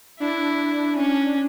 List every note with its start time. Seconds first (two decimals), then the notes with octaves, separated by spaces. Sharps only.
0.20 D4 E4
0.96 C#4